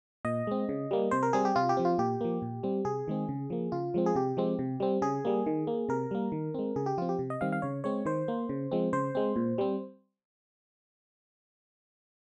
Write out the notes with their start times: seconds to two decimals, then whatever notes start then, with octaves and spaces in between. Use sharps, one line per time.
0.25 A#2 D#5
0.47 G#3 C4
0.69 C#3
0.91 G3 A#3
1.11 C3 C5
1.23 A#4
1.33 G3 C4 G#4
1.45 G4
1.56 C3 F4
1.69 G4
1.77 F3 C4
1.85 F4
1.98 A#2 G4
2.21 F3 A#3
2.42 A#2
2.63 G3 C4
2.85 C3 G#4
3.08 D#3 G#3 C4
3.29 C#3
3.50 F3 A#3
3.72 C#3 F4
3.94 F3 G#3 C4
4.06 G#4
4.15 C3 G4
4.37 F3 G#3 C4
4.59 C3
4.80 G3 C4
5.02 C#3 G#4
5.25 G3 A#3
5.46 D#3
5.67 A#3
5.89 C3 A#4
6.11 G3 A#3
6.32 D#3
6.54 G#3 C4
6.76 C#3 G#4
6.86 G4
6.98 F3 C4 F4
7.09 G4
7.19 C3
7.30 D#5
7.41 D#3 G3 C4 F5
7.52 F5
7.62 C#3 C#5
7.84 G#3 C4 C#5
8.06 D#3 C5
8.28 A#3
8.49 C#3
8.72 F3 G#3 C4
8.93 C#3 C5
9.15 G#3 C4
9.36 A#2
9.58 G3 C4